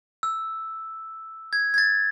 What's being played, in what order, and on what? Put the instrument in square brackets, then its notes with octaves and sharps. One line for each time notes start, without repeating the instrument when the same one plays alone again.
[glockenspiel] E6
G#6
G#6
A6